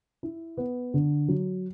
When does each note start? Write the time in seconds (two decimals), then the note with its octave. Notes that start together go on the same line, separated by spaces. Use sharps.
0.23 E4
0.57 B3
0.94 D3
1.28 F#3